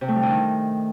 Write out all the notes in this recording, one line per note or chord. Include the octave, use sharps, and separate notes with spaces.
C3
A3
G3
D3
D#3